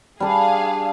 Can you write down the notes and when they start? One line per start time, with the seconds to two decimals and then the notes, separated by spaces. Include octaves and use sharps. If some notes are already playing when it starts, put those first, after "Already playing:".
0.20 G3 D4 G#4 F5